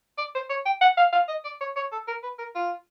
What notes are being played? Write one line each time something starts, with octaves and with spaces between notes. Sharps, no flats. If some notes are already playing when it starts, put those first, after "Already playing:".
D5
C5
C#5
G5
F#5
F5
F5
D#5
D5
C#5
C#5
A4
A#4
B4
A#4
F4